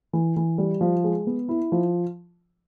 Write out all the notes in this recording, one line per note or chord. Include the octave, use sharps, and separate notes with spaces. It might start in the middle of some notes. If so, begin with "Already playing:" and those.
E3
E3
G3
F3
G#3
B3
E4
F3